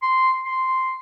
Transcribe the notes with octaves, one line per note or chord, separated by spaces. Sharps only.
C6
C6